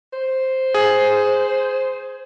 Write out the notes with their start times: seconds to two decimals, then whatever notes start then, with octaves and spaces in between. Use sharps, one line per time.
0.13 C5
0.74 G#4